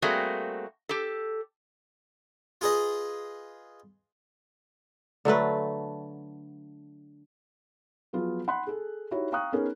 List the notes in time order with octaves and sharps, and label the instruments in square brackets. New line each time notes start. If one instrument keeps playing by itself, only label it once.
[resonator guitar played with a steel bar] G3 A3 A#3 C4 F#4 G#4
G4 A4
[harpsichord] F4 G#4 B4 D#5
[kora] D3 F#3 A3 B4
[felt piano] F3 F#3 B3 F4 G#4
F#5 B5 C6 F#6
G#4 A4
D#4 E4 F#4 G4 C#5
F5 G5 A#5 C#6 D#6 F#6
B3 C#4 D#4 G#4 A#4